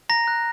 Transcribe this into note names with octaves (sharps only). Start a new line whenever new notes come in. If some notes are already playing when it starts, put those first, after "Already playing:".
A#5 A#6
F#6